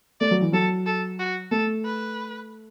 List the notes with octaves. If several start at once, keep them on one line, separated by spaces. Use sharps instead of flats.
A3 D5
F#3
E3
F#3 A4
A4
F#4
A3 A4
B4